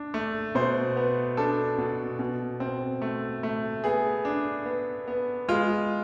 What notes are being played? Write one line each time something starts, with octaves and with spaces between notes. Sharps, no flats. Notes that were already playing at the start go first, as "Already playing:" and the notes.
Already playing: D4
A3
B2 C5
B3
D4 A4
B2
B2
C4
A3
A3
B3 G#4
D4
B3
B3
G#3 F4